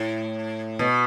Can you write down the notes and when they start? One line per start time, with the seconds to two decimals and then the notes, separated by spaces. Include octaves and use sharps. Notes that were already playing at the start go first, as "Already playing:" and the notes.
Already playing: A2
0.79 B2